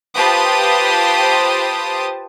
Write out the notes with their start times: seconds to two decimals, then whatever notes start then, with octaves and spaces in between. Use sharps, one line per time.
0.16 F4 G4 B4 C5 A5 D#6